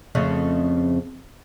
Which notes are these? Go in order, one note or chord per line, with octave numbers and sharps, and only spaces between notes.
F2 C#3 A3